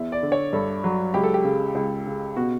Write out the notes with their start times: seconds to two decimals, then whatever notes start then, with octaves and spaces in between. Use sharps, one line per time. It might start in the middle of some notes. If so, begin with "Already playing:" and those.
Already playing: E2 E5
0.12 D5
0.23 D3
0.32 C#5
0.53 G2 A4
0.84 F#3
1.14 C#2 G4
1.23 A4
1.34 G4
1.44 C#3
1.75 C#2
2.07 C#3
2.36 B2 F#4